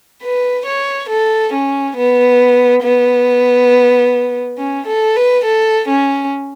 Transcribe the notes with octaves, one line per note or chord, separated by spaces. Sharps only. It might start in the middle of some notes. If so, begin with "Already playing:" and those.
B4
C#5
A4
C#4
B3
B3
C#4
A4
B4
A4
C#4